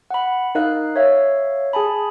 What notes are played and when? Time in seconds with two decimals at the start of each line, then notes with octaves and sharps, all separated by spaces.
0.11 F#5 B5
0.55 D#4 A#4 D#5 F5 F#6
0.96 C#5 E5 F5
1.73 G#4 G#5 A5 B5